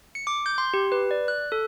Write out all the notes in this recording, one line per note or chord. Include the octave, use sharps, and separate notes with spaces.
C#7
D6
G6
C6
G4
B4
D5
F#6
A4